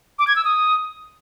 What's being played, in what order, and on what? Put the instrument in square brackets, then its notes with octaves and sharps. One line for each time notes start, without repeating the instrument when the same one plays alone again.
[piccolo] D6
G#6
E6
D#6